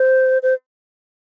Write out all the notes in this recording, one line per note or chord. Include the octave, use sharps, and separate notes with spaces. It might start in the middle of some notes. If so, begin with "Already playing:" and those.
Already playing: C5
C5